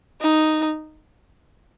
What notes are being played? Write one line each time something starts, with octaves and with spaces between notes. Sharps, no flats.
D#4